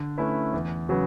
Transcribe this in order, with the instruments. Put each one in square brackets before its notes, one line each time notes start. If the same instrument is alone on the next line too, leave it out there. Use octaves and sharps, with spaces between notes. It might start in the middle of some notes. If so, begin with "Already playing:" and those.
Already playing: [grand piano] D3
A3 C#4 E4 B4
E2
C#3 F#3 B3